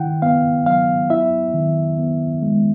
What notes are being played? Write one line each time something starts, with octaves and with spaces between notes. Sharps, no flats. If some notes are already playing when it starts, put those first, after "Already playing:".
Already playing: D#3 E4 F#5 G5
B3 F5
F#3 F5
E4 E5
D#3
B3
G#3